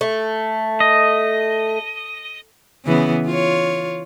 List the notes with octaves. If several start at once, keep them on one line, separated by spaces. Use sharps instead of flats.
A3
D#5
C#3 E3 B3
F4 C#5